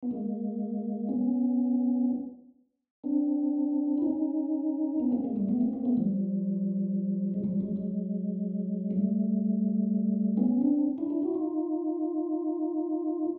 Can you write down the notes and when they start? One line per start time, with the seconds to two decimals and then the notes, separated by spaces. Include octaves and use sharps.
0.03 B3
0.11 G#3 A#3
1.08 B3 C#4
3.04 C4 D4
3.98 E4
4.02 C#4 D#4
5.00 B3 C#4
5.11 A#3 C4
5.24 G#3 A#3
5.36 G3 A3
5.48 A3 B3
5.61 A#3 C4
5.73 A#3 C4
5.85 A3 B3
5.97 F3 G3
7.34 G#3
7.44 F3 G3
7.60 F#3 G#3
7.76 F#3 G#3
8.91 G3 A3
10.37 B3 C#4
10.61 C4 D4
10.98 D4 E4
11.10 D4 E4
11.22 E4 F#4
11.34 D#4 F4